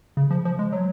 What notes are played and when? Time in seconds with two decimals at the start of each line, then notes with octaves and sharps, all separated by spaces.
0.17 C#3
0.31 F3
0.45 F3
0.59 G#3
0.72 F#3